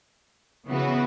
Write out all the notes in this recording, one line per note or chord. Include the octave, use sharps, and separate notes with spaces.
C#3 E3 B3 F#4 B4